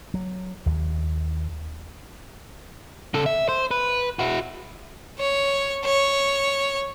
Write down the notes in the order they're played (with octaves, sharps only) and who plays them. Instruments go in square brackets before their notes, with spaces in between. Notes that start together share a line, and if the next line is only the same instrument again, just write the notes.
[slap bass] F#3
D#2
[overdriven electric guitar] C#3 A4
E5
C5
B4
E4 F#4
[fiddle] C#5
C#5